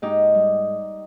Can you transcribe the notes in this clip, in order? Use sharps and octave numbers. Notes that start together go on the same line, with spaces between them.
G#2 D#4 G4
G3